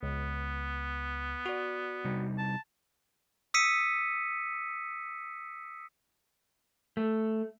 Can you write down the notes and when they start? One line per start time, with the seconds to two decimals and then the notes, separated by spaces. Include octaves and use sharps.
0.03 C#2 B3
1.46 F#4 D5
2.04 C3 G3 D#4
2.38 A5
3.54 D#6 E6 B6 C#7 D#7
6.97 A3